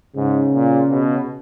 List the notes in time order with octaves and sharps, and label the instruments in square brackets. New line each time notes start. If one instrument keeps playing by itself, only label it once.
[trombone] G#2 [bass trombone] C#3
[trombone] A#2
B2